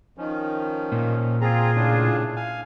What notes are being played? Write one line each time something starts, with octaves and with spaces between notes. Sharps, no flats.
D#3 F3 C#4
A#2
C4 F4 G#4 A#5
A2 C#3 D4
F5 G#5